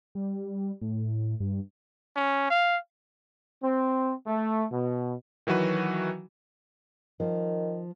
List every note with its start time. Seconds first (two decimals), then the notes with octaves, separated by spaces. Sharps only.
0.15 G3
0.81 A2
1.40 G2
2.16 C#4
2.50 F5
3.62 C4
4.26 A3
4.71 B2
5.47 D#3 E3 F#3 F#4 B4
7.20 D#3 F3